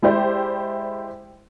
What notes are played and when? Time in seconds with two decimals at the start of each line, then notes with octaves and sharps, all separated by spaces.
0.02 G#3 E4 G4 C5 D5